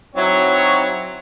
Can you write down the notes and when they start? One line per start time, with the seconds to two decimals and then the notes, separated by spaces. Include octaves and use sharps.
0.16 F#3 C4 D#4 E4 F#4 C#5